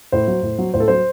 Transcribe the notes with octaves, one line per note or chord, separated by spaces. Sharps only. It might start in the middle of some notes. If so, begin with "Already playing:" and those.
A2 C5
F#3
A2
F#3
A2 C5
A4
F#3 C5